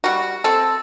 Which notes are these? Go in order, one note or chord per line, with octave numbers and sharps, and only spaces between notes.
G3 F#4
C4 A4